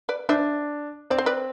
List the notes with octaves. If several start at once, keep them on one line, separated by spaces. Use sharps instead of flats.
B4 D5
D4 C5 E5
C4 D5
C5
B4 D5